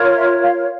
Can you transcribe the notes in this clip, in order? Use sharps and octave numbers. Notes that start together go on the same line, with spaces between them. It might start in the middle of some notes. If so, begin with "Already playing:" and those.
Already playing: F4 A#4 C#5
E5
F5